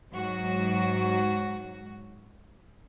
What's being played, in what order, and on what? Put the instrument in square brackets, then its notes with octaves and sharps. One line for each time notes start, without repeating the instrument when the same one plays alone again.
[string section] G#2 F#3 F#4